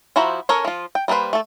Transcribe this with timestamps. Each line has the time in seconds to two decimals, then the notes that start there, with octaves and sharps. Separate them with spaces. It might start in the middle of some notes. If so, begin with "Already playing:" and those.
0.16 F3 E4 F#4 C5 A#5
0.49 C#4 A4 A#4 C#5 G#5
0.65 F3 F4
0.95 G5
1.08 G3 A#3 D4 B4 C5
1.33 A3 A4